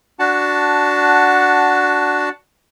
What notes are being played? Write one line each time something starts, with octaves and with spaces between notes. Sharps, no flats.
D4 F#4 F#5 A5